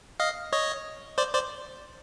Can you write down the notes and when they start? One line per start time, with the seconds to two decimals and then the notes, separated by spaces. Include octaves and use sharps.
0.20 D#5 F5
0.53 C#5 D#5
1.18 C5 D5
1.34 C5 D5